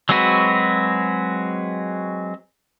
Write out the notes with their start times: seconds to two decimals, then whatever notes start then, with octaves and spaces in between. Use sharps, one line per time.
0.09 F#3 G#3 C4 F#4 B4